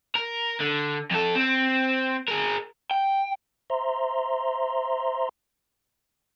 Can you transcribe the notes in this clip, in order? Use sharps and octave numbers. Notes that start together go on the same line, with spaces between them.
A#4
D3
F2 A4
C4
G#4 A#4
G5
C5 E5 A#5 C6